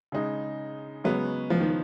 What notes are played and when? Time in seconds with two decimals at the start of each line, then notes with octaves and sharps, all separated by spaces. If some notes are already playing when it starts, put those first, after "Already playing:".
0.12 C#3 G#3 D#4
1.04 C#3 F#3 G#3 B3
1.50 F3
1.60 D#3